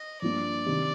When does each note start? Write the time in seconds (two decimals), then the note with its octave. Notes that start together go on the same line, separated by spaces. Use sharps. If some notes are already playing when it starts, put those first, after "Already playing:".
Already playing: D#5
0.22 G2 F3 A#3 D5
0.66 C3 D#3 A#3 D#4 G4